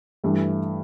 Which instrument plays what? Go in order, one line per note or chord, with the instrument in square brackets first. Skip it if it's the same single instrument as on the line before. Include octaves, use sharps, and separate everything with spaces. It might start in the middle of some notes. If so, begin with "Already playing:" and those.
[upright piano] G2 E3 A3